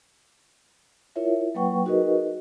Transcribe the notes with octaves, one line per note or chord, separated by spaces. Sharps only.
E4 F4 A#4 C#5 E5
F#3 A#3 B4 F#5 G5 C#6
D#4 F#4 G#4 A#4 B4 D#5